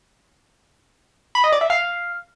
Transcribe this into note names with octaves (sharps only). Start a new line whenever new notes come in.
B5
D#5
D5
E5
F5